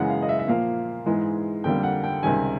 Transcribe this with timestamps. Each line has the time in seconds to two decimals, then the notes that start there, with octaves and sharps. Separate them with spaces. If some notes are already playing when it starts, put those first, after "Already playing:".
Already playing: F#2 C#3 E3 G#3 F#5
0.10 F5
0.22 D#5
0.29 E5
0.39 E5
0.48 A#2 F3 A#3 F5
1.06 G#2 E3 G#3
1.64 F2 D3 G3 A#3 G5
1.83 F#5
2.04 G5
2.23 C#2 C3 D#3 G3 G#5